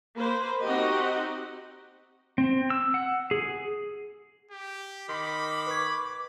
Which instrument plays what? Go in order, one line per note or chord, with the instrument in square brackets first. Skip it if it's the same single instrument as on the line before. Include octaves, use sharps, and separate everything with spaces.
[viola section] A#3 B4 C5
C4 D#4 F#4 G4 D#5 F#5
[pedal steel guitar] C4
E6
F#5
G#4
[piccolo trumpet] G4
[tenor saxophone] D#3 [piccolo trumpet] B5 [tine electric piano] C6 [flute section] D6
[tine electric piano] B4 C#6 G#6